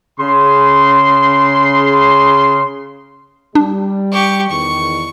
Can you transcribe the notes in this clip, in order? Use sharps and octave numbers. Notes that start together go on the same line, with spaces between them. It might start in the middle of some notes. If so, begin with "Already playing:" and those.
C#3 C6
G3 D4
G4 C#6
E2 D#3 C#6